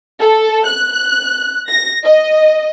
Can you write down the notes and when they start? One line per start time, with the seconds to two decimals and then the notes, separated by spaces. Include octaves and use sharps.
0.19 A4
0.66 F#6
1.68 A#6
2.04 D#5